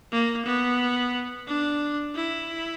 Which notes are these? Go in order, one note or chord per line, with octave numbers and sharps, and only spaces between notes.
A#3
B3
D4
E4